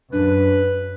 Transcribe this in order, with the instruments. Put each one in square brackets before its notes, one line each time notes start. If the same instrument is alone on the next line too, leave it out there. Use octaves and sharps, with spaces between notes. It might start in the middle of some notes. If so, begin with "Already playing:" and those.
[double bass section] F#2 [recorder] D4 [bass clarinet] B4